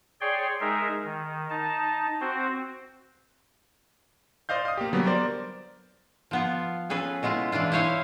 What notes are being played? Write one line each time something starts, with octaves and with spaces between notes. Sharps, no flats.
G#4 C#5 D5 G5 C6
G#3 D#4 G#4 A#4 E5
D#3
D#4 A5
C4 F#4 C5
C5 D5 D#5 F5 G6
F5 D#6
A#3 G4
D3 F#3 G3 B3
A#4 C5 D5
F3 B3 F4
C#4 G#4 A4 B4
B2 G#3 E4 F4
E3 D4 E4 F4
E4 C5 C#5 F5 G#5